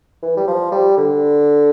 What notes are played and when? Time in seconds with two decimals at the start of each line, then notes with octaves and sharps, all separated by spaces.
0.23 E3
0.37 G3
0.48 F3
0.72 G3
0.98 D3